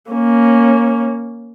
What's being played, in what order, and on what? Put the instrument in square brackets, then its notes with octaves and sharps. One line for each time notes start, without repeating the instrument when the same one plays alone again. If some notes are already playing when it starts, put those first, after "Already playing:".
[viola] A#3 C#4